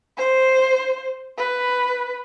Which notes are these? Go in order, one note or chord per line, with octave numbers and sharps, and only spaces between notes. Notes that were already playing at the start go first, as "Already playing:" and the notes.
C5
B4